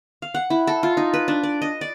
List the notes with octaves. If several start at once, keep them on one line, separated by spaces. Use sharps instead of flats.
F5
F#5
E4
A4
F4
D#4
B4
D4
D5
D#5
D5